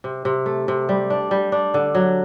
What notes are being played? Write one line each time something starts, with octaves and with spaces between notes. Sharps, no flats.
C3
C3
A3
C3
G3
D4
G3
D4
D3
F#3